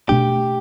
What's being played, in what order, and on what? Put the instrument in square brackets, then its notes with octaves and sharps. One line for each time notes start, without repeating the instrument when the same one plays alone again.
[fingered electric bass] B2 A3 D4 [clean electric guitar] G4